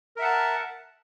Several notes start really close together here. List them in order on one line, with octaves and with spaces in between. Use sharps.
A#4 E5 F#5 A5